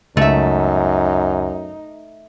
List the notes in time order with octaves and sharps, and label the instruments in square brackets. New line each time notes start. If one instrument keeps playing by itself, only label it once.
[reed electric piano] C#2 [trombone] F#2 [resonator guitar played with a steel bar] A3 E5 [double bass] D#4